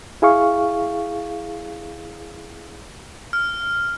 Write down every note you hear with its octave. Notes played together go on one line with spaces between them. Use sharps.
E4 G#4 F5 C#6
F6